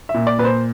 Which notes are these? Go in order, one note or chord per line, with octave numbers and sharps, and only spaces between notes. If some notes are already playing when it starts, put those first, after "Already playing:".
E5
A#2
D5
A#2 B4
C5